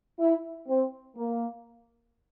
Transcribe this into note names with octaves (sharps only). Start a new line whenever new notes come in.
E4
C4
A#3